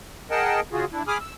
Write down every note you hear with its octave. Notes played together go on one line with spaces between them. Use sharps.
G#4 A#4 D#5 F#5 G5 A5
C#3 F4 F#4 G#4
D4 E4
G#4 G#5 B5 D6 D#6 F6
E6